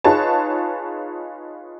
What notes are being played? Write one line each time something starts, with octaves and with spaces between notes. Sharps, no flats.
D#4 F4 G#4 B4 C#5 A5